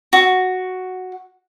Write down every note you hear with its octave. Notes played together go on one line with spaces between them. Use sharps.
F#4